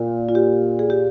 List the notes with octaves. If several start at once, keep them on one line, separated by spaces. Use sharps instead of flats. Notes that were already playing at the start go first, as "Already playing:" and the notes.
Already playing: A#2
F4
G4
G#4
G4